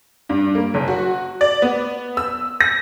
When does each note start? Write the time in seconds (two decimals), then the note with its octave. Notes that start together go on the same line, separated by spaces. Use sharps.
0.29 G2
0.55 A#3
0.74 F#1
0.88 F#4
1.41 D5
1.62 B3
2.17 E6
2.61 A#6